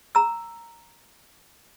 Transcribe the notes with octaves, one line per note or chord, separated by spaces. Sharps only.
A#5 E6